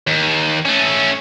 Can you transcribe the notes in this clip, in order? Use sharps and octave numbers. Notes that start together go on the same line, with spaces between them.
D#2
A3 C#4